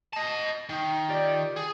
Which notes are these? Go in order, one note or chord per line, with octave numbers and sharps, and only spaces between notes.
D#5 A5
D#3
F4 G4 D5
G#4